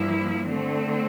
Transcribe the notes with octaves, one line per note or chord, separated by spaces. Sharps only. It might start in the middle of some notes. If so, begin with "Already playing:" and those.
Already playing: G2 F3 A#3 E4
D3 A3 C4